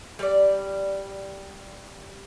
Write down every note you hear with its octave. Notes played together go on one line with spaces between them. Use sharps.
G3 D5